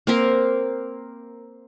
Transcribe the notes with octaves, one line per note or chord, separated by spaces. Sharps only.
A#3 C4 A#4